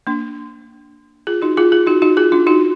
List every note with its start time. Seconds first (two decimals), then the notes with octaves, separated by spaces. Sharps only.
0.07 A#3 D4
1.27 F4 G#4
1.42 D#4 F#4
1.57 F4 G#4
1.72 F4 G#4
1.87 D#4 F#4
2.02 D#4 F#4
2.17 F4 G#4
2.32 D4 F4
2.47 D#4 F#4